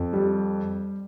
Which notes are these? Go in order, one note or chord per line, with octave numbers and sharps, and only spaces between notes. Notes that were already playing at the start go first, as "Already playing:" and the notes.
Already playing: F2
G3